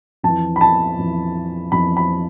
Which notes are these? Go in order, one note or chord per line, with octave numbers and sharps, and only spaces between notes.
F2 E3 A5
B5
A5
F2 E3
F2 E3 B5
B5